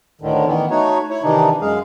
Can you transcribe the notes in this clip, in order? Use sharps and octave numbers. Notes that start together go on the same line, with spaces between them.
D2 A2 D3 D#3
D#3 E3 B3
A3 D#4 F#4 C#5
E4 C#5
C3 D#3 E3 D4 D#4
F#2 G#3 G#4 F5